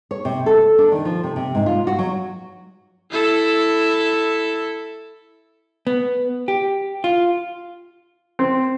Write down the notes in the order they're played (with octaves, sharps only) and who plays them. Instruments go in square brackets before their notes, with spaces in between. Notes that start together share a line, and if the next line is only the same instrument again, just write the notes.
[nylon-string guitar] C#5
C3
A4
D4
D#3
F3
C3
C3
G#2
F4
F#4
F#3
[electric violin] E4 A4
[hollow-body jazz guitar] B3
G4
F4
[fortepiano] C4